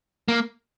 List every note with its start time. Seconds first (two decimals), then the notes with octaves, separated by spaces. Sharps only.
0.28 A#3